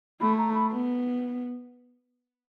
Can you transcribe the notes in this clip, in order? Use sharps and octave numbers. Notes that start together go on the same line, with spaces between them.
A3 B5
A#5
B5
B3